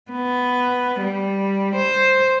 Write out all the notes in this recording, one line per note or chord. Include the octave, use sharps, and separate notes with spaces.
B3
G3
C5